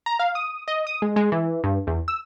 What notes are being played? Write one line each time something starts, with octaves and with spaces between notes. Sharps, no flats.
A#5
F5
D#6
D#5
D#6
G#3
G#3
E3
G2
E2
E6